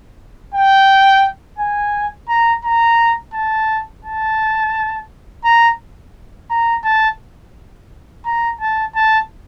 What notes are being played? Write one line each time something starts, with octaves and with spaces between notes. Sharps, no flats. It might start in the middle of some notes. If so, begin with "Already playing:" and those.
G5
G#5
A#5
A#5
A5
A5
A#5
A#5
A5
A#5
A5
A5